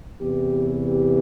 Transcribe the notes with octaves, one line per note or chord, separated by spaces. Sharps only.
E2 C3 E3 G4
G4